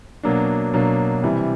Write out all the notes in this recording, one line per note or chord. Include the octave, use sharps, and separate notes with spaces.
B2 F#3 A#3 D4
B2 F#3 A#3 D4
C3 E3 G3